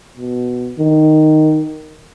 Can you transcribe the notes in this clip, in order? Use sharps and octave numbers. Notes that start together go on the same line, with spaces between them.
B2
D#3